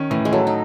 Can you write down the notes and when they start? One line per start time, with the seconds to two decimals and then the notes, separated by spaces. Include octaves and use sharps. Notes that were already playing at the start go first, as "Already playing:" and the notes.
Already playing: D#3 C#4
0.10 A2 E3
0.25 G#3
0.33 F#3 A4
0.47 D#4